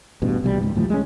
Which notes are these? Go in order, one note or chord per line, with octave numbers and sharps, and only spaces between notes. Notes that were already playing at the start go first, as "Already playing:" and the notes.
A1 G2 B2
C2 B2 G3
C#2 G#2
D2 A2 F3 G3
G#3 C#4